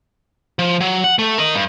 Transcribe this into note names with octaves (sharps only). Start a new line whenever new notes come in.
F3
F#3
F#5
A3
A#4 D#5
G2